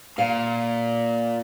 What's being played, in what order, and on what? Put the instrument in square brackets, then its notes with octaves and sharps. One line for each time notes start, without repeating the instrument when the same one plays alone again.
[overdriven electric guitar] A#2 [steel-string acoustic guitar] F5